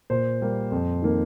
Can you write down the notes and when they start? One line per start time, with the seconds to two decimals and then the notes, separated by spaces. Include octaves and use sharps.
0.10 A#2 C5
0.41 G3 A#3
0.72 F2
1.02 D#3 A#3